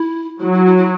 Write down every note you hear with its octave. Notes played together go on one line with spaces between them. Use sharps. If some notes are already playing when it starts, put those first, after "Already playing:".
Already playing: E4
F#3 E4
E4
E4
E4